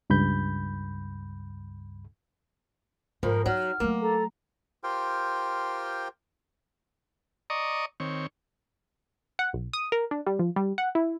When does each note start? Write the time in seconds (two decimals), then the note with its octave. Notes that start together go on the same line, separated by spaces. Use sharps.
0.10 C#2 G2 B5 G6
3.23 F2 G#2 F3 A#4
3.46 F#3 D#4 F6
3.80 F#3 A3 A#3
4.01 A4 A#5
4.84 F4 G4 A#4 C5 G5
7.50 D5 D#5 A#5 C#6 D#6
8.00 D#3 C4 C#5
9.39 F#5
9.53 B1
9.73 D#6
9.92 A#4
10.11 D4
10.26 G3
10.39 F3
10.56 G3
10.78 F#5
10.95 E4